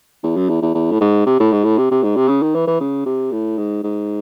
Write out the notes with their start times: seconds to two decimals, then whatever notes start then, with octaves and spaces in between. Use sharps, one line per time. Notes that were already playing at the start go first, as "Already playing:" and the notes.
0.23 E2
0.36 F#2
0.49 E2
0.62 E2
0.75 E2
0.91 A2
1.01 G#2
1.26 C3
1.40 A2
1.52 G#2
1.64 A2
1.78 C3
1.91 C3
2.03 G#2
2.16 C3
2.28 C#3
2.42 D#3
2.55 E3
2.67 E3
2.80 C#3
3.06 C3
3.32 A2
3.58 G#2
3.83 G#2